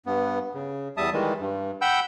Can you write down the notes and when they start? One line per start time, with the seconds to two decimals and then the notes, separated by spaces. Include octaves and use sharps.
0.06 G2 B3
0.54 C#3
0.97 E2 G3 E5 A5 D#6
1.13 D#3 E3 G3 G#3
1.40 G2
1.81 F#5 G5 B5 E6 G6